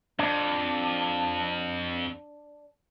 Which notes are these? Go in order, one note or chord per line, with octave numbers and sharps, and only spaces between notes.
F2 D4